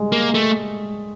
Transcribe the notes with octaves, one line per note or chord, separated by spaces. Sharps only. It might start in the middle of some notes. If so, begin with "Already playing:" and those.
Already playing: G3 G#3
A#3
A3